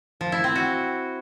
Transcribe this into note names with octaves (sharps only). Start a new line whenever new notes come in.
F3
E4
C4
F#4